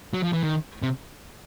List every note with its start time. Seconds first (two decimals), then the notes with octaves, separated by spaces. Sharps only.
0.13 F#3
0.23 F3
0.33 E3
0.43 D#3
0.83 C3